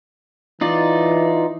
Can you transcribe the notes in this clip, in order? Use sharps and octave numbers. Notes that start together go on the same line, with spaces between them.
E3 D#4 F4 D5